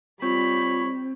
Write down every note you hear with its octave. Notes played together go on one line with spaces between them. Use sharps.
G3 C4 F4 C#5 B5